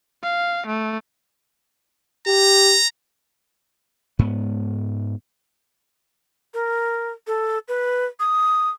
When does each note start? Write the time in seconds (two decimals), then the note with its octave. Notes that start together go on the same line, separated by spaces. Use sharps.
0.23 F5
0.67 A3
2.27 G4 A#5
4.19 G#2 B3
6.54 A#4
7.27 A4
7.68 B4
8.20 D#6